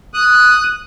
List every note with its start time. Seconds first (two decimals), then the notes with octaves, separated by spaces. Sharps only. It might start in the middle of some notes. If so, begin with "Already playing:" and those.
0.14 D#6 F#6